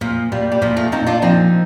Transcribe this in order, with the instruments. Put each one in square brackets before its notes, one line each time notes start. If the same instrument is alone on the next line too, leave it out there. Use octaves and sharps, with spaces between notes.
[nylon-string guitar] A#2 [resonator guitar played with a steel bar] F3
[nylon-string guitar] A#2 [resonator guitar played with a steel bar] G3
[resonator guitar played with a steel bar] G3
[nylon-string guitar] A#2 [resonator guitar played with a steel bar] F3
[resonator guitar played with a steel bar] F3 A3
[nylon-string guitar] A#2 [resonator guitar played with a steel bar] C4 D#4
[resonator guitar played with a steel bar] D4 F4
[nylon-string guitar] F3 [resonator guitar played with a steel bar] C4 D#4